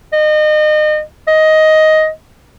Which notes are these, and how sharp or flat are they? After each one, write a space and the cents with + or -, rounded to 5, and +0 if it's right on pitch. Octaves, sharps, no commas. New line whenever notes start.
D#5 -30
D#5 +10